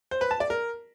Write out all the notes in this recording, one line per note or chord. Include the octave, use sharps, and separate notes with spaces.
C5
B4
A5
D5
A#4